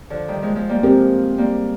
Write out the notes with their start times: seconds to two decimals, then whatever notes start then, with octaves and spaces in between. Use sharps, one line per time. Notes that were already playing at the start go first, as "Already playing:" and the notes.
0.10 D3 F3
0.28 D#3 G3
0.42 F3 G#3
0.56 F3 G#3
0.69 G3 A#3
0.83 F3 G#3 C4 G4 A#4
1.38 G3 A#3